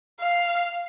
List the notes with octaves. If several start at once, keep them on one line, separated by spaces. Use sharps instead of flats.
F5